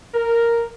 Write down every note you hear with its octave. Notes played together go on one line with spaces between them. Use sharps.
A#4